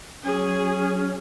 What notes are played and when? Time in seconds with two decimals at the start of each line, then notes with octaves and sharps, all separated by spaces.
0.23 F#3 C#4 G#4